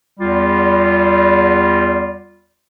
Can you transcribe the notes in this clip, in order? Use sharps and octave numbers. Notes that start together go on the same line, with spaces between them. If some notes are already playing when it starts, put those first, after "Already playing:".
E2 G3 F4